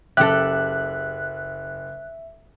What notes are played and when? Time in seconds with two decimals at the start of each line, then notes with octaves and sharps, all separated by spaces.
0.17 F#1 C#3 G4 A4 E5 F#6